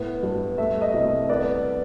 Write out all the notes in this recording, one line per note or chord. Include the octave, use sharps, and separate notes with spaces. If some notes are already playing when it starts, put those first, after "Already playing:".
Already playing: A2 B3
G2
A3 E5
D#5
C2
B3 D5